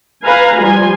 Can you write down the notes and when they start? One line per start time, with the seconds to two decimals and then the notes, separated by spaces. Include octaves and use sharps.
0.24 B4 F5 G#5 A#5 B5
0.61 F3 G3 G#5 C6